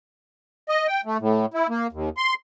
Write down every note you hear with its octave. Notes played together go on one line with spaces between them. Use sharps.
D#5
G5
A3
A2
E4
A#3
D#2
C6